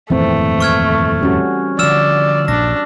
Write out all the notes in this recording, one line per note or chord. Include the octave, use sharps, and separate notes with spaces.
D#1 F2 G#2 E3 A3 C4
C#6 F6 G#6
G3 C#4 F#4
D3 F3 D5 E6 F6 E7
A#1 G2 D4 A#6